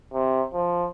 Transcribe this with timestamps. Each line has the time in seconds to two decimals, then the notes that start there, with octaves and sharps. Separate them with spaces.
0.13 C3
0.53 F3